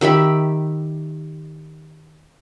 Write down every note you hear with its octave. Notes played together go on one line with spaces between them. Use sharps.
D#3 G4 E5 B5